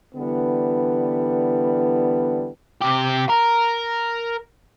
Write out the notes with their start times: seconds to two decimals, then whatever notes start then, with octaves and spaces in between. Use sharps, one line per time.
0.14 D3 E3 G3 B3
2.82 C3 G4
3.30 A#4